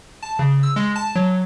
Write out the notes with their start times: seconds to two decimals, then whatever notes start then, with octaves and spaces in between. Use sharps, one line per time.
0.22 A5
0.39 C#3
0.63 E6
0.76 G#3
0.96 A5
1.15 F#3